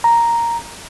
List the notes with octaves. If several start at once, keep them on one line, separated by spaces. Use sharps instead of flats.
A#5